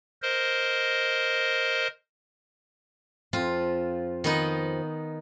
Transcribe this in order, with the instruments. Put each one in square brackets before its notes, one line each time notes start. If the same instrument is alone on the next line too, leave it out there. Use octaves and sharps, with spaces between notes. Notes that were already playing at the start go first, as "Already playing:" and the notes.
[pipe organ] A#4 C5 D#5
[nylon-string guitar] F2 F3 C4 [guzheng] F4
[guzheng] D#3 B3 D#4